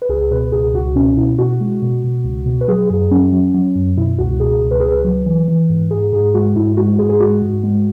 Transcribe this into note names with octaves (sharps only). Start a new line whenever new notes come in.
B4
C#2 G#4
B2 B4
C#2 G#4
C#2 F#4
B2 C#4
B2 E4
B2 F#4
G#3
B2
B2
C#2
B2
B4
F#3 G#4
F#2 G#4
F#3 C#4
F#3
F#3
F#2
B2 E4
C#2 F#4
B2 G#4
C#2
B4
C#2 G#4
B4
F#3
E3
E3
G#2
G#2 G#4
G#2 G#4
G#3 F#4
G#2 E4
G#3 F#4
G#2 G#4
G#4
G#3 F#4
G#2
G#3